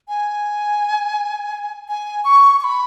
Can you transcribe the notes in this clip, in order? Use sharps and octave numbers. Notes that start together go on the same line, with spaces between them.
G#5
G#5
C#6
C#6
B5